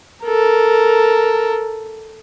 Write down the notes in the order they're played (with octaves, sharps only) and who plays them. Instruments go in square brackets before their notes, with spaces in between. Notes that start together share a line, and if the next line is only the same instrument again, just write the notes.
[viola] A4 A#4